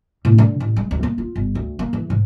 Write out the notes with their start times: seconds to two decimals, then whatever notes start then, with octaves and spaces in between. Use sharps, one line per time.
0.25 A2
0.38 D3
0.60 A1
0.76 G#3
0.91 D2
1.03 A#3
1.18 F4
1.36 G1
1.55 D2
1.79 A#3
1.93 E3
2.10 G#2